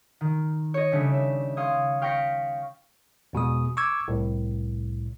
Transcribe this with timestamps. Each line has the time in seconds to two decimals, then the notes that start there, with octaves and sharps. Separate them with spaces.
0.21 D#3
0.74 C#5 D#5
0.92 C#3 G3 A3 D4
1.14 E5
1.57 F5 C6 C#6 D#6 G#6
2.02 F5 G5 C#6 A#6 B6 C#7
3.33 E2 B2 G#3 D#6
3.77 C#6 D6 E6 G#6
4.08 C2 A2